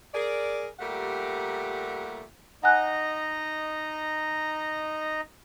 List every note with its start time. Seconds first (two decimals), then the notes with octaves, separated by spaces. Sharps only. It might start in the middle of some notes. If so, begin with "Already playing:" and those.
0.14 G#4 A#4 D5
0.80 A#2 G3 A3 G4 A#4 F#5
2.63 D#4 D#5 F#5 G#5 A#5 F#6